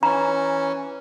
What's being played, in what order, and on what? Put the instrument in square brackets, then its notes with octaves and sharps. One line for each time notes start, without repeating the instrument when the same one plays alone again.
[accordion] E3 C#4 [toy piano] A#5